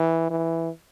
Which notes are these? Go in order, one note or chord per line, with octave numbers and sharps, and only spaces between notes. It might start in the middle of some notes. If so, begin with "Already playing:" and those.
Already playing: E3
E3